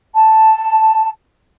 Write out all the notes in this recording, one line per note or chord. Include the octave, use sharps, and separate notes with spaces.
A5